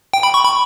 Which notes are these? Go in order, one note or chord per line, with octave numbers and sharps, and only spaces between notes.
G5
B5
C#6
B5